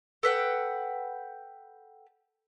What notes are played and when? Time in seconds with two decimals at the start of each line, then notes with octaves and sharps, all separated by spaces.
0.23 A4 B4 F#5 G5